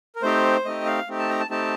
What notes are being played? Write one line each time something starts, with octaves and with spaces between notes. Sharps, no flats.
A#4
A3 C4 D#4 G4 C5
A3 C4 D#4 G4 D#5
F5
A3 C4 D#4 G4
A5
A#5
A5
A3 C4 D#4 G4 A5